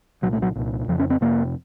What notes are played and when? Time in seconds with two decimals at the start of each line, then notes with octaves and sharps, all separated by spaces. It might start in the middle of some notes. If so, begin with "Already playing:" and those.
0.22 C2 A#2 F#3
0.32 A3
0.42 F#3
0.56 C2 A#2
0.88 F2 C#3 F3
0.99 C#4
1.10 C4
1.21 F2 C3 A#3